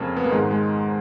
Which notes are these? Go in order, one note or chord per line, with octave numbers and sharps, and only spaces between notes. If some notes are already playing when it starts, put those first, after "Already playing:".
Already playing: F2 C#3 A#3
B3
A#3
G#2 D#3 G#3
G#3